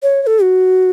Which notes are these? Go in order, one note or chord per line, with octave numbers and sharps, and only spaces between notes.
C#5
C#5
A4
F#4